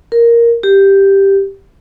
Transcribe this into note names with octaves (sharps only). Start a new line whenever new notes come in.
A#4
G4